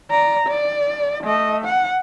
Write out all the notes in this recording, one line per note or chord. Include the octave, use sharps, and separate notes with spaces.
D5 A#5
D5
A3 D#5
F#5